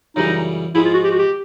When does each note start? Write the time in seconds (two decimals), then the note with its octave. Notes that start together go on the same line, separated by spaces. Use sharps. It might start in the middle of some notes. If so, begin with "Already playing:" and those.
0.16 F#2 C#3 E3 G3 D#4
0.75 G#2 F3 G#3 E4
0.85 F4
0.94 F#4
1.04 G4
1.11 F#4
1.19 G4